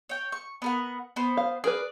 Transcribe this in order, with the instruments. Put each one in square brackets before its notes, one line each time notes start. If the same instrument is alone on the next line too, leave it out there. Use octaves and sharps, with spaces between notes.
[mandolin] C#5 G5
C#6
B3 A#4 F#5
B3 C5
[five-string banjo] F5
[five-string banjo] G#4 A#4 B4 [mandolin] D5